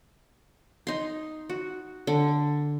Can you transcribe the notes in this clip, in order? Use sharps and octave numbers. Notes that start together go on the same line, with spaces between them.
D#4 C6
F#4
D3